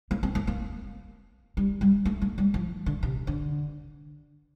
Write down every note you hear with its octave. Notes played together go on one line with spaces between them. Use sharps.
A#3
C4
A#3
A#3
G3
G3
A3
A3
G3
F3
D3
C3
D3